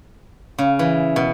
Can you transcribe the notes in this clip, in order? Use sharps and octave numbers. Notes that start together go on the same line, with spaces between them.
C#3
E3
B2